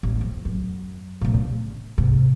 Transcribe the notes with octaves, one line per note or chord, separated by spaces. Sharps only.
A1
F2
F#2
A#1 A2
C#3
G#2 C3